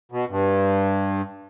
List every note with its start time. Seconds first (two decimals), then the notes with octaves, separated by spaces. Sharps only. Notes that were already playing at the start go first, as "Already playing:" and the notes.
0.12 B2
0.29 G2